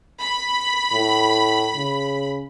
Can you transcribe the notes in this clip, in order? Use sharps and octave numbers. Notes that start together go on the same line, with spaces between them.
B5
A2
C#3